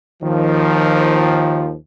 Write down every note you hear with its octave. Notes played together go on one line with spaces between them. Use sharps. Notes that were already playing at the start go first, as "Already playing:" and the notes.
D#2 D#3 F3